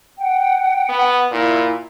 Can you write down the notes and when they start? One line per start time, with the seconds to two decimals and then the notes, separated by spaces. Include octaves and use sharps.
0.18 F#5 G5
0.89 B3
1.32 A#2 E4